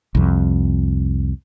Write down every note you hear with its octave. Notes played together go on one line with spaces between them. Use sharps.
C2 F2